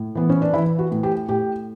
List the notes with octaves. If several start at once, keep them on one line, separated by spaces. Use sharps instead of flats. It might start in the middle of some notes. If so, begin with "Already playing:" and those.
Already playing: A2
E3 B3
C#4
D4
E3 E4
F#4
A2
G4
A2 G4